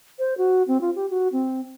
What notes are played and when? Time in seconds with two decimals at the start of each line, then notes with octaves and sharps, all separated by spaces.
0.19 C5
0.38 F#4
0.68 C4
0.81 F4
0.96 G4
1.10 F#4
1.32 C4